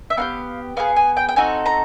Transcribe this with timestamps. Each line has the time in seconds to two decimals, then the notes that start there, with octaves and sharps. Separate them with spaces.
0.10 E5
0.17 B3 D#4 G4 F5
0.77 B3 D#4 G#4 F5
0.96 G#5
1.17 G5
1.29 G5
1.36 C4 D#4 F#4 A4 G#5
1.66 A#5